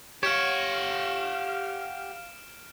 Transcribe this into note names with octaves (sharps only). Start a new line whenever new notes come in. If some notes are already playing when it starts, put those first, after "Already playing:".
G4 C#5 F5 F#5 F6 D7 E7